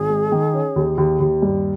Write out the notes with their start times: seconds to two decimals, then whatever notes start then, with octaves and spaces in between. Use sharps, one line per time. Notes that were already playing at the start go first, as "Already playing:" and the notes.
Already playing: G#1 G#4
0.09 G#3
0.32 D#3
0.54 C#4
0.76 D#2
0.98 D#2
1.20 D#2
1.42 G2